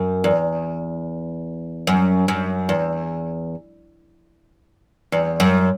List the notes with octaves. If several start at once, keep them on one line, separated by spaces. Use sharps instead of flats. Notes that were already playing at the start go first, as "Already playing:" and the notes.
Already playing: F#2
E2
F#2
F#2
E2
E2
F#2